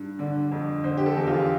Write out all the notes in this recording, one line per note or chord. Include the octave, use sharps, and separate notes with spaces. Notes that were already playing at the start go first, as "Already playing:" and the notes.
Already playing: G2
D3 D5
F2
D3 C5
G4
A4
E2
F4